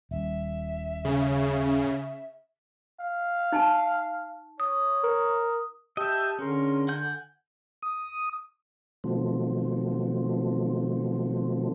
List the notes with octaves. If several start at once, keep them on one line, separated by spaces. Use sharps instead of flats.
D#1 E5
C#3
F5
D#4 G#5 A5
C#5 D#6
A#4
G4 D#5 E5 A5 E6 G6
D3 C#4 G#4 A#4 C6
F#5 G#5 G6
D#6
B2 D#3 F3 F#3 A3 C4